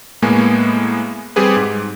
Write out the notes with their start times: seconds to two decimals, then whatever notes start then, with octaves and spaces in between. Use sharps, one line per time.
0.22 A2 G#3 A#3 B3 G#5
1.36 G3 C4 G4 G#4 B4
1.56 G#2